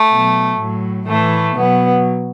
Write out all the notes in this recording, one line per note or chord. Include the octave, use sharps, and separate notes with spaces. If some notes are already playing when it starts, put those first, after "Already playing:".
Already playing: A3
B2 F#3
A2 F#3
A2 E3 A3
B2 F#3 B3